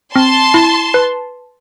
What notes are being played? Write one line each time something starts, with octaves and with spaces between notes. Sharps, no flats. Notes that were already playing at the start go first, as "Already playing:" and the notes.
C4 A5 C6
E4
B4